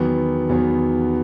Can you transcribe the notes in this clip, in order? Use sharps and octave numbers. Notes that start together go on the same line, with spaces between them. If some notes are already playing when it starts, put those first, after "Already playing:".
Already playing: E2 D#3 F#3 B3
E2 D#3 F#3 B3